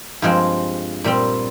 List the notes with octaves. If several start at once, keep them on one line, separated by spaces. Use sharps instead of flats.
G2 F3 G#3 C4
A#2 G3 C4